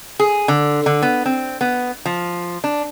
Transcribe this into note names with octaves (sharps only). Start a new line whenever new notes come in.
G#4
D3
D3
B3
C4
B3
F3
D4